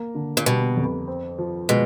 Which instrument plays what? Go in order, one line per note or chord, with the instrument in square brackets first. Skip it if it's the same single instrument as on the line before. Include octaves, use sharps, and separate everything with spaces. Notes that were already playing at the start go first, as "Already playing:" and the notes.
Already playing: [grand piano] A#3
D3
[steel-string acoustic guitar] A#2
[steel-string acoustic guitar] B2 [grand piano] G3
[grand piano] F2
C4
F3
[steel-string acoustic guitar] B2 [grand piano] G#3